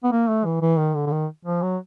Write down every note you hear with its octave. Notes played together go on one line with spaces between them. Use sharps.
B3
A#3
A3
E3
E3
D#3
D3
D3
D#3
F3
F#3